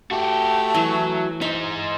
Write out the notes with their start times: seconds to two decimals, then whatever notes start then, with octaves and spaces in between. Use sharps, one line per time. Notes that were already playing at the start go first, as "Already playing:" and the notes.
0.11 A3 F#4 G4
0.75 E3 F#3
1.41 D#4 C5 E5